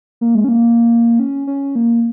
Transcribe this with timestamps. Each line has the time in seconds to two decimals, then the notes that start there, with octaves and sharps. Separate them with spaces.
0.21 A#3
0.35 G#3
0.44 C#4
0.49 A#3
1.19 C#4
1.47 C#4
1.75 A#3